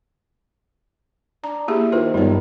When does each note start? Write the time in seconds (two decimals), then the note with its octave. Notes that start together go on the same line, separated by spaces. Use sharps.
1.44 D4 A#5
1.68 A#3 E4 G4 G#4
1.92 D#3 F4 B4 C5
2.14 G1 D#3 D#4 C#5